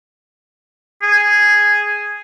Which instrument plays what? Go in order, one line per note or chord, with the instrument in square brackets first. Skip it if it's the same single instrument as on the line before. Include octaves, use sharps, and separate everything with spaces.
[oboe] G#4